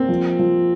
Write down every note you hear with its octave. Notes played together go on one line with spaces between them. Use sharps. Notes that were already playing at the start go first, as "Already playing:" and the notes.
Already playing: A#3 C4
F3
F3